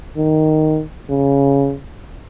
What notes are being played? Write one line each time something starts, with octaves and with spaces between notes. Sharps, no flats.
D#3
C#3